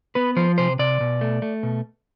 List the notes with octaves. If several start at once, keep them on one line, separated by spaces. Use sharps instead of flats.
B3 B4
F3 C5
C3 C5
C3 D5
B2
A3
A3
B2